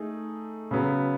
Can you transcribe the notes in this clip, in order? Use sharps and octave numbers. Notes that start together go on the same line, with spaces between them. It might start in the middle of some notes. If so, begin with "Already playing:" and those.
Already playing: A3 D#4 G#4
C#3 F#3 B3